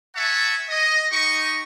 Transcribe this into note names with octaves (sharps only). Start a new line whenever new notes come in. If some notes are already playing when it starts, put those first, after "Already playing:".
E5 F#5 G#5 A5 C#6
D#5
D#4 G4 D#5 C#6